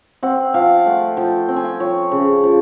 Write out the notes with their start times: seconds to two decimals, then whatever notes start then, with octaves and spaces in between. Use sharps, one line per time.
0.23 C4 F#5
0.54 F3 F5
0.86 A3 F#5
1.17 F3 G5
1.48 C4 G5
1.56 G#5
1.64 G5
1.80 F3 C#5
2.12 C#3
2.44 F3